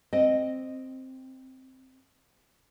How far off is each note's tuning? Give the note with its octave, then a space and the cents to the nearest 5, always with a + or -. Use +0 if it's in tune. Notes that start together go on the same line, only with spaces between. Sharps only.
C4 +0 D#5 -10